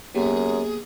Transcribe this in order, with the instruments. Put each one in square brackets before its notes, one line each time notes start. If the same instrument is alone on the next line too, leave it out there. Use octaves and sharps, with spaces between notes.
[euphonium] F#2 [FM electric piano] A#3 B3 G4 [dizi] G#4